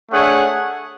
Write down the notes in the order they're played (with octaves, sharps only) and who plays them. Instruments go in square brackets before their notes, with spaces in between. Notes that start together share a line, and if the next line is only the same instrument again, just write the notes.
[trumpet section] A3 D4 G#4 C#5 F#5